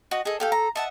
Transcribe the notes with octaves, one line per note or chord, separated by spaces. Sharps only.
F#4 D#5
G#4 A4 D#5
G4 A4 F5 G5
A#5
D#5 E5 F#5 A5